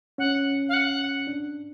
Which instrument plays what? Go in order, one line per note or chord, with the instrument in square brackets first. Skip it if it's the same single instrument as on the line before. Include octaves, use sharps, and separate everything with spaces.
[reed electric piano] C#4 [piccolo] F#5
[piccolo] F5
F#5
[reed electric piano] D4